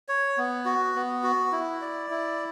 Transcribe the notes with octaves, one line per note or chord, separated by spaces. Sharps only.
C#5
B3
F#4
B3
F#4
E4
D5
E4